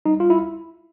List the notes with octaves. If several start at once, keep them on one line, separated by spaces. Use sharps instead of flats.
G3 D#4
F4
E4